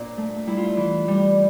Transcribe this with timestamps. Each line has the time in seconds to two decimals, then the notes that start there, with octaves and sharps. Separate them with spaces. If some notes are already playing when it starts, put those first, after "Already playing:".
Already playing: A#2 C4 D4
0.18 A3
0.46 G3 E4
0.57 F4
0.68 E4
0.77 E3
1.08 G3